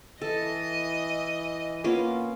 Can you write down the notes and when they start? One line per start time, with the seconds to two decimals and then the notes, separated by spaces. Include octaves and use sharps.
0.21 E3 A4 D#5
1.84 A#3 B3 C#4 F4